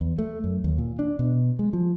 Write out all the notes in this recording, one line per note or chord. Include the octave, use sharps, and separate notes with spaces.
E2
A3
F#2
D#2
A#2
D4
B2
G#3
F3